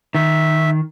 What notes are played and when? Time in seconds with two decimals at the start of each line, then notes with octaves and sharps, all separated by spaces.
0.15 D#3 E5